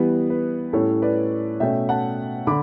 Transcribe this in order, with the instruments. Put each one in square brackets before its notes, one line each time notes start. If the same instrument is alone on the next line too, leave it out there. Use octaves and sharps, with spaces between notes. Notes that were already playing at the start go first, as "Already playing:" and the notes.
Already playing: [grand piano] E3 G3 B3 B4
B4
A2 G3 C#4 A4 C#5
B4 D5
B2 A3 C#4 E5 G5
F#5 A5
D3 B5 D6